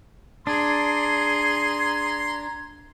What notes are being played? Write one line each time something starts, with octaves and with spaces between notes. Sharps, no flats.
D4 G#4 A#5 C6 G#6